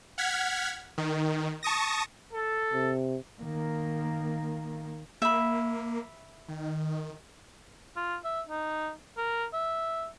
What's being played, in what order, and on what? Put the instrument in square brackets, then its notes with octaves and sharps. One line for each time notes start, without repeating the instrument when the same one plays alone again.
[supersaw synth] F#5 F6 G#6 B6
D#3
A5 C#6 D#6 A#6
[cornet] A4
[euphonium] C3
[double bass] D#3 A#3
[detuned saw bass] A#3 [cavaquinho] E5 B5
[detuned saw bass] D#3
[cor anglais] F4
E5
D#4
A#4
E5